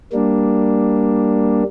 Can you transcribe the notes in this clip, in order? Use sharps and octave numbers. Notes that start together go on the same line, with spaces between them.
G3 A#3 D4